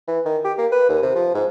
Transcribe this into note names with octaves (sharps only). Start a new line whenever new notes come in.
E3
D#3
G4
A#3
B4
D#2
C3
F3
G#2